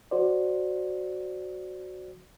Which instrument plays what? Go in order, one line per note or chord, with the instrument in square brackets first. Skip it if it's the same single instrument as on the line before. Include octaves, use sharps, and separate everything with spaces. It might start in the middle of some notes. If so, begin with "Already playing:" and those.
[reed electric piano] F#4 C5 D5